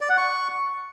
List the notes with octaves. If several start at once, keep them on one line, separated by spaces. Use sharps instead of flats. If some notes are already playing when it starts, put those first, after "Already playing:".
D5
F#5
C#6